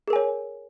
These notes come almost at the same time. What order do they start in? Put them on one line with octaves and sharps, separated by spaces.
G#4 A#4 G#5 C#5